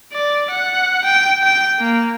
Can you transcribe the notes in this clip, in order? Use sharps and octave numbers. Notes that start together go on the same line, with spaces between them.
D5
F#5
G5
G5
A#3